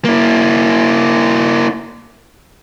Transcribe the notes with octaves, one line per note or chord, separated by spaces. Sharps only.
A#3 E4